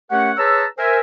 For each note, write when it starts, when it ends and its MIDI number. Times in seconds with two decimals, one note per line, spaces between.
0.11 0.32 57
0.11 0.32 61
0.11 0.32 67
0.11 0.32 70
0.11 0.32 73
0.11 0.32 78
0.38 0.65 68
0.38 0.65 71
0.38 0.65 73
0.38 0.65 81
0.38 0.65 82
0.38 0.65 88
0.78 1.00 70
0.78 1.00 72
0.78 1.00 76
0.78 1.00 80